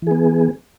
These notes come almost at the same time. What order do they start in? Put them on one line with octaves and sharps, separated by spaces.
E3 G#4 B3